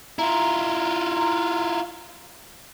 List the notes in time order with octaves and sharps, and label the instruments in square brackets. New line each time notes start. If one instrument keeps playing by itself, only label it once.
[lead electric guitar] E4 F4 [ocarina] A#5